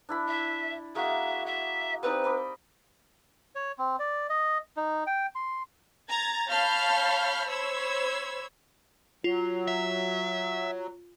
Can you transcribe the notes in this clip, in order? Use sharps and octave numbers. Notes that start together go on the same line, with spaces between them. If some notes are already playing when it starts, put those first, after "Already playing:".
D4 E4 B5
E5
G#3 A#3 F#4 E5
E5
G3 C4 D#4 B4
D#5 B5 D6
C#5
C4
D5
D#5
D#4
G5
C6
A#5 G#6 A6
C#5 F5 A5 B5 F6 G6
C5 C#5 B5 E6 G#6
F#3 F4
E5